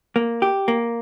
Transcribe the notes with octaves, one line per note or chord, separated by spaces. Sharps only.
A#3
G4
A#3